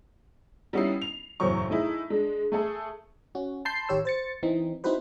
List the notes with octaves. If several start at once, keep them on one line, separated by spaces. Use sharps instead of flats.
G3 B3 C#4 D#4 E4 C7
F7
F#1 E2 A2 F#3 C5 C#6
A3 D#4 E4 G#4
G#3 D4
A3 G#4 A4
C#4 F#4
A5 B5 C6 G6 C7
A1 D#3 G4 C#5 E6
C5 A6 C#7
E3 C4 D#4
C4 D#4 E4 F#4 B4 C5